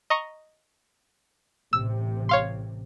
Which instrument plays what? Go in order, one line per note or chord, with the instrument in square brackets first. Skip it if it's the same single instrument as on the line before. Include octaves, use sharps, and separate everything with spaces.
[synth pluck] D#5 A#5 C#6
[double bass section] A1 C3 [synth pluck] E6
[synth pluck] C#5 F5 C6